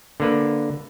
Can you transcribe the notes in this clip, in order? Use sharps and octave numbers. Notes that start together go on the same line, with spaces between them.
D3 A#3 B4